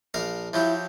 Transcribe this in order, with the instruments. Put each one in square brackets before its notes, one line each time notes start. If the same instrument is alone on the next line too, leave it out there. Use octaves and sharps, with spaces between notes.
[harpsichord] A#1 A#4 F5
[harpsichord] F3 F#3 G4 [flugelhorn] E4